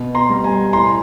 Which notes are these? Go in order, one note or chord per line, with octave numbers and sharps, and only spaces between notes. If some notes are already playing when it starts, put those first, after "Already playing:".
Already playing: B2
A#5 C6
G3
G#5 A#5
A2 A#5 C6